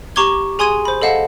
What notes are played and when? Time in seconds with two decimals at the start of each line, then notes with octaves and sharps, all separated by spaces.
0.16 G4 A#5 C#6 D6 G#6 G7
0.59 G#4 G#5 C6 D#6 G#6 D#7
0.85 C5 B5
1.02 A4 D#5 F5 F#5 A5